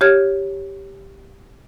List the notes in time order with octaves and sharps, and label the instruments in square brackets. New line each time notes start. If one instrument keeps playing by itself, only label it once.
[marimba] G4 C#5 F6 G#6